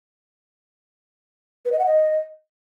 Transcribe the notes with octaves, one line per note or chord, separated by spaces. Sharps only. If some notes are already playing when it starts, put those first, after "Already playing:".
B4
D#5
F#5
D#5